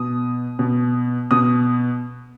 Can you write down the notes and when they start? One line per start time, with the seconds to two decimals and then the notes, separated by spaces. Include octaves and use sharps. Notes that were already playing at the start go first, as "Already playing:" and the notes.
Already playing: B2 D#6
0.59 B2
1.31 B2 D#6